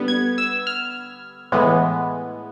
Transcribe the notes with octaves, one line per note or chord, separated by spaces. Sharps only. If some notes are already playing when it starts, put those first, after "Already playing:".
Already playing: D3 G3 B3
G#6
E6
F6
A2 E3 G#3 B3